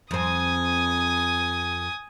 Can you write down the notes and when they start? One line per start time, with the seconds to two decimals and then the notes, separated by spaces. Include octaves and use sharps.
0.11 F2 C4 G#5 D#6